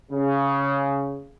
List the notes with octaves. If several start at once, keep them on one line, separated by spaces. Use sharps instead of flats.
C#3